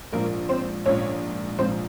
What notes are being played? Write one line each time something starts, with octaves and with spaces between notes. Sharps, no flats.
A#1 G#2 F3 A#3 A#4
C4 C5
A#1 G#2 F3 C#4 C#5
A#1 G#2 F3 C4 C5